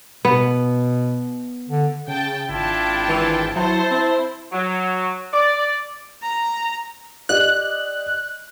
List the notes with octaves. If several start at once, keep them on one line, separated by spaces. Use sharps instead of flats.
B2 B3
D3
C#3 G5 A5
G#1 D4 E4 F4 G5 A5
E3
F#3 E4 C5 A5
C4
F#3
D5
A#5
G4 D5 D#5 F#6